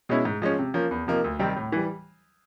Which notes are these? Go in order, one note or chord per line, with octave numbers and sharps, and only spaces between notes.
B2 G#3 C#4 E4
G#2
F3 G#3 C#4
C3
F3 A#3 C#4
E2
C3 F3 A#3 D#4
D2
C3 D#3 G3 C4
A2
E3 G3